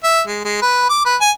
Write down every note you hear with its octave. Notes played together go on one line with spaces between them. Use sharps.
E5
G#3
G#3
B4
D6
B4
G#5